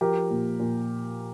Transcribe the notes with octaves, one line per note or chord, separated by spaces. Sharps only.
F3 G4 A#4
A#2
A#2